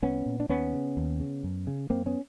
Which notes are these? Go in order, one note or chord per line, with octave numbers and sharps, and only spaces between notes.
C2 B3 C#4
A#2
D4
D#2 B3 C#4
C#3
D#2
C#3
F#2
C#3
F#2 A#3 C4
B3 C#4